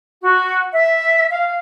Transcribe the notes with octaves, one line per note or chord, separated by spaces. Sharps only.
F#4
E5
F5